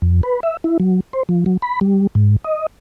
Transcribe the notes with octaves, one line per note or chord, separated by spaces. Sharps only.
F2
B4
E5
E4
F#3
C5
F3
F#3
B5
G3
G#2
D#5